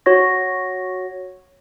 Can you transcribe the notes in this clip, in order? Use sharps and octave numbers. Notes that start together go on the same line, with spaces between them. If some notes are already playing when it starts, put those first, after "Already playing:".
F#4 C#5 C#6 A#6